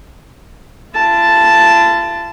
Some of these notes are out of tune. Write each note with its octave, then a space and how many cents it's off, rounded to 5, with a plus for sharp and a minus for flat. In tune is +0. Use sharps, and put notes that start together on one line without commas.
F4 -45 A5 +0